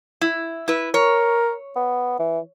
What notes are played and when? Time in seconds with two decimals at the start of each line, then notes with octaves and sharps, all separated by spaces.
0.21 E4
0.68 E4 B4
0.94 A#4 C#5
1.76 B3
2.19 E3